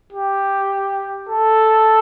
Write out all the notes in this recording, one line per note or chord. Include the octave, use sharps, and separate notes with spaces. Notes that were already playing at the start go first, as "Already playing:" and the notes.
G4
A4